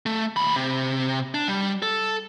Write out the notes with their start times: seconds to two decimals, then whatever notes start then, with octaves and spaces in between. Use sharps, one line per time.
0.06 A3
0.37 D#2 B5
0.56 C3
1.34 D4
1.48 G3
1.82 A4